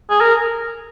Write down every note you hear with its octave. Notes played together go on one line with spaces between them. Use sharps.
G#4
A#4